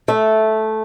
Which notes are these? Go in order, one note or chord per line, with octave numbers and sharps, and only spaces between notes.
A3